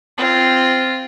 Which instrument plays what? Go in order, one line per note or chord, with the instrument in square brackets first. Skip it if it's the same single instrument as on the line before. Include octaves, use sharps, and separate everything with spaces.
[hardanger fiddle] C4 F4